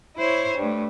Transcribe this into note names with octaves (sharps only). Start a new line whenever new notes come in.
E4 C5 C#5
G2 A3